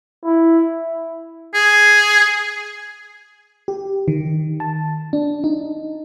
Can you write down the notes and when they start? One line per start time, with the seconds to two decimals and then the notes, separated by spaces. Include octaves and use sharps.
0.25 E4
1.54 G#4
3.68 G4
4.08 D#3
4.60 A5
5.13 D4
5.44 D#4